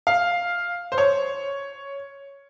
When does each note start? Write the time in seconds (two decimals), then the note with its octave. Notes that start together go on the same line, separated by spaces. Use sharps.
0.07 F5
0.92 C5
0.98 C#5